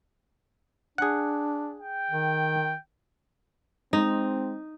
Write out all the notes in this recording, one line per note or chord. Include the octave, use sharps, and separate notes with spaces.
D4 G#4 F#5
G5
D#3
G#3 C4 D#4